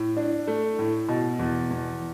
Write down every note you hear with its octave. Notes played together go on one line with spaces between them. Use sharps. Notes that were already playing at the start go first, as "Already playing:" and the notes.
Already playing: A2
D4
A3
A2
B2
E2
E2